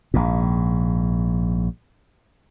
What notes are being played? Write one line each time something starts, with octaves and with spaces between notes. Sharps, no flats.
A#1 G#2